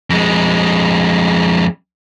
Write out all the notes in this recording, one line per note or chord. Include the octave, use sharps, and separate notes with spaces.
F2 G#3